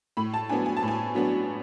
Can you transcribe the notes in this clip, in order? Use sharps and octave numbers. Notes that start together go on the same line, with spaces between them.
A2 B5
A5
F#3 B3 D4 G#5
G#5
A5
A2
G#5
F#3 B3 D4